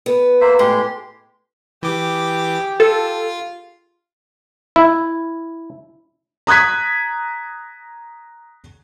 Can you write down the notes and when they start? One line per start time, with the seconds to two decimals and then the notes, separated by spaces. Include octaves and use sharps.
0.06 B3
0.41 A#3 C5 E5
0.59 A2 G#3 G4 C6
1.83 E3 G4 G#4 D6
2.80 F4 A4
4.76 E4
6.47 A#5 D#6 F#6 G#6 B6